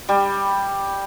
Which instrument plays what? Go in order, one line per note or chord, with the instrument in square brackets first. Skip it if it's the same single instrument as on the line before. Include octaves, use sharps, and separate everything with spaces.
[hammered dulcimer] G3